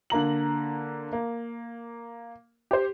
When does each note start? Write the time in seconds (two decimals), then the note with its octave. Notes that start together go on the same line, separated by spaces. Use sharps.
0.10 D3 A#3 A#5 F#7
1.13 A#3
2.71 G4 C5